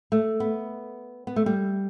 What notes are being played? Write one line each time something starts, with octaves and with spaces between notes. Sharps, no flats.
A3
B3
B3
A3
G3